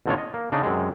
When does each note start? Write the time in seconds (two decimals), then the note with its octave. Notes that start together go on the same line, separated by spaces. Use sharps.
0.06 A1 E2 D3 G#3 F4 C#5
0.18 D#5
0.34 A#3
0.52 C#3 D4 D#4
0.63 F#2 C3 G#3